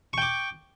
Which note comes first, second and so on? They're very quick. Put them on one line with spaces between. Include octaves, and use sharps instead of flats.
C#6 G5 D6